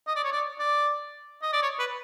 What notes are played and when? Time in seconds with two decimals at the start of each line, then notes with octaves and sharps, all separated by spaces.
0.07 D#5
0.16 D5
0.24 C#5
0.32 D5
0.59 D5
1.42 D#5
1.53 D5
1.62 C#5
1.79 B4